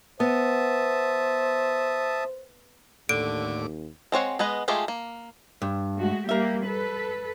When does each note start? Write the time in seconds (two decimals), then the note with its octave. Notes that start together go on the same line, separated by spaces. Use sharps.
0.20 B3 C5 E5 A5 D#6
3.09 D#2 A2 D3 D6 D7
4.12 G#3 C4 C#5 F#5
4.39 G#3 B3 B4 D#5
4.68 G#3 A3 F4 G4 G#4
4.88 A#3
5.62 G2
5.95 G#3 A3 F#4
6.29 G3 A#3 G4 A#4 E5
6.66 A4 B4